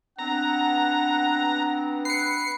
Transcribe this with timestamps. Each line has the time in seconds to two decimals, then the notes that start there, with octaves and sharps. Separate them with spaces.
0.19 B3 C4 D4 F#5 A#5
2.05 B4 C7 C#7